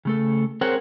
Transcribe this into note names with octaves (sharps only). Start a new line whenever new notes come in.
C#3 A3 A4
C4 G#4 A#4 C5 C#5 F#5